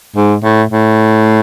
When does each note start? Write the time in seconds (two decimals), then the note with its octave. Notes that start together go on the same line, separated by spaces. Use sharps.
0.16 G#2
0.44 A2
0.71 A2